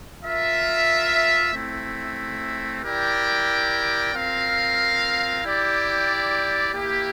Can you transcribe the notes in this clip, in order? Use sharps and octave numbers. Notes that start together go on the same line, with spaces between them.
F4 A#4 E5
A3 C4 E4
E4 G4 A#4 D5 G5
C4 F4 A#4 F5
E4 G4 D5 G5
A#3 E4 G4